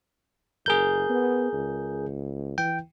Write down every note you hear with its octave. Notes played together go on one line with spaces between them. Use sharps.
F#1 G#4 A#4 G6
B3
C#2
E3 G5